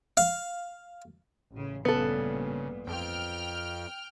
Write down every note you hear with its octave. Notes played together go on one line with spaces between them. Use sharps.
F5
A1 C#3
A1 G2 A#2 C#3 B3 A4
F2 G5 F6